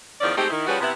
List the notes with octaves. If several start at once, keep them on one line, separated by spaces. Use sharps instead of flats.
E2 D#3 F3 C#4 D5
G#3 A3 C4 D#4 G4
D#3 E4
F3 G3 C#4 F#4 G#4 B4
C3 B3 E4